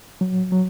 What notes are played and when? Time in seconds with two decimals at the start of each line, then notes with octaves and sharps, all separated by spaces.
0.21 F#3
0.52 F#3